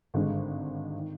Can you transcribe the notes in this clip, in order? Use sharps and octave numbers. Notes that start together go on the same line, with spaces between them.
G#1 G2 D3 G#3
D#3